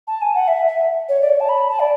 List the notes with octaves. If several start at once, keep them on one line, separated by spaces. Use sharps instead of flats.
A5
G#5
F#5
E5
E5
C#5
D5
C#5
A5
B5
A5
D5